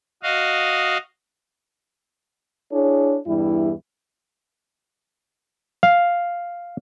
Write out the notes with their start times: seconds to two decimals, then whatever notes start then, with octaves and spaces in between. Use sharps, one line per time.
0.23 F#4 D#5 F5
2.72 D4 E4 G#4 C#5
3.27 E2 G2 G3 E4
5.83 F5